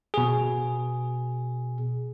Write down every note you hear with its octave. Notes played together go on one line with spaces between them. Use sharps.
B2 G#4